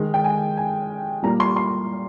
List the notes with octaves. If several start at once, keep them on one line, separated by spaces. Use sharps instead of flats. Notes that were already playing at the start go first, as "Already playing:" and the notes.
Already playing: D#3 G#3
G5
G#5
G#5
A#2 G3 A#3 A#5
C6
C6